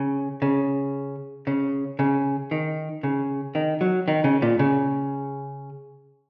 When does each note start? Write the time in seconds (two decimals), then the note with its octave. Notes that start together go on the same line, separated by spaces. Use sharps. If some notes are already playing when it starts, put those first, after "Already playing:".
Already playing: C#3
0.42 C#3
1.47 C#3
1.99 C#3
2.51 D#3
3.03 C#3
3.55 D#3
3.81 F#3
4.08 D#3
4.24 C#3
4.42 A#2
4.59 C#3